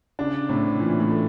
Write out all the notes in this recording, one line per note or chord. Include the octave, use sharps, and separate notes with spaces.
C#3 D4
A2 C3
A#2 E3
A2
A3